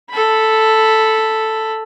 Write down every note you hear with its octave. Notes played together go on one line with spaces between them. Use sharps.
A4 B5